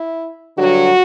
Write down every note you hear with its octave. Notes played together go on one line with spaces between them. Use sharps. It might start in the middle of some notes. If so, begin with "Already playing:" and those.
Already playing: E4
G2 D3 F#3 F#4